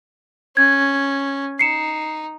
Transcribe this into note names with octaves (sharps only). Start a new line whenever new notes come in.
C#4 G#6
D#4 C7 C#7 E7